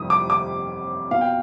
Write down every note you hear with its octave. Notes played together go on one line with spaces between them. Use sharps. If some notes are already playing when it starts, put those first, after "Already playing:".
Already playing: F2 C3 D#3 G3 D#6
D6
D6
B2 B3 F5
G5